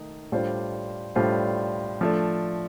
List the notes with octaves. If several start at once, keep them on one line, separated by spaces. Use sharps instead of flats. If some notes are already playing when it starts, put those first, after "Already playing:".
Already playing: D#3 A3 D#4
A2 G3 D4 F4 C5
A2 G3 D4 F4 C5
F3 A3 D4